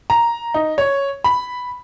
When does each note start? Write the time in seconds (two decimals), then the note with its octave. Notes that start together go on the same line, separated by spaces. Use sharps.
0.10 A#5
0.54 D#4
0.78 C#5
1.24 B5